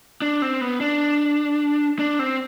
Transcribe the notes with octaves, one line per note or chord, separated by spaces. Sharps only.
D4
C4
B3
D4
D4
C4